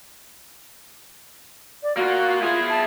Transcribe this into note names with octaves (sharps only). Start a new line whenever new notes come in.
D5
A#3 F4 F#4
E4 F4 G#4
A5